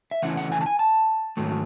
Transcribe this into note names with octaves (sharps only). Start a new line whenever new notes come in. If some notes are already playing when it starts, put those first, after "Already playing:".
E5
C#3 E3 A3 C#4 E4 F#5
F#5
G#5
A5
G#5
A5
G#2 D#3 F#3 A3